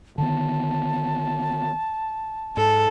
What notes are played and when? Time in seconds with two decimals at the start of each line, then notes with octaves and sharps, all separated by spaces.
0.18 D3 D#3 B3 A5
2.57 G#2 A4